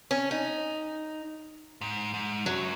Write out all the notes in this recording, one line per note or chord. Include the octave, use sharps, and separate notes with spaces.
C#4
D#4
G#2
G#2
F#2 F#3